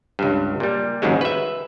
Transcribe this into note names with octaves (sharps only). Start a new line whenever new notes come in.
C#2 G2
A#2 G3
G#1 D#2 G#2 C#3 F#3 G#3
B4 E5